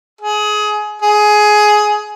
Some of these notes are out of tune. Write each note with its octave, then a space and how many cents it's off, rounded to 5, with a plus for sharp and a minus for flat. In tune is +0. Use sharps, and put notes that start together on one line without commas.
G#4 +20
G#4 +15